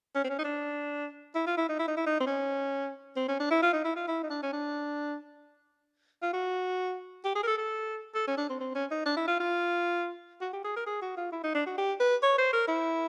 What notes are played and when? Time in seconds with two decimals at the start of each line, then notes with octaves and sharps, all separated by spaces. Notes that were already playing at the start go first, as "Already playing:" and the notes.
0.15 C#4
0.24 C4
0.29 C#4
0.39 D#4
0.44 D4
1.35 E4
1.47 F4
1.57 E4
1.69 D#4
1.79 E4
1.88 D#4
1.97 E4
2.06 D#4
2.20 C4
2.26 C#4
3.16 C4
3.28 C#4
3.40 D4
3.51 E4
3.62 F4
3.73 D#4
3.85 E4
3.96 F4
4.07 E4
4.23 D#4
4.30 D4
4.43 C#4
4.53 D4
6.22 F4
6.33 F#4
7.25 G4
7.35 G#4
7.43 A#4
7.47 A4
7.58 A4
8.15 A4
8.27 C#4
8.37 D4
8.49 C4
8.60 C4
8.75 C#4
8.91 D#4
9.06 D4
9.17 E4
9.28 F4
9.40 F4
10.41 F#4
10.53 G4
10.64 G#4
10.76 A#4
10.86 G#4
11.02 F#4
11.17 F4
11.32 E4
11.44 D#4
11.55 D4
11.66 F#4
11.78 G4
12.00 B4
12.23 C#5
12.38 C5
12.53 A#4
12.68 E4